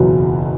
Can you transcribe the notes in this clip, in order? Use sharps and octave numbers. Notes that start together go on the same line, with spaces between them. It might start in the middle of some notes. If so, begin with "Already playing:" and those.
Already playing: F#1 E2 B2 F#3